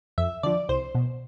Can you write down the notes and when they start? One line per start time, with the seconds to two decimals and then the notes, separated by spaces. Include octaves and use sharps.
0.18 F2 E5
0.43 D3 F3 D5
0.69 C2 C5
0.95 B2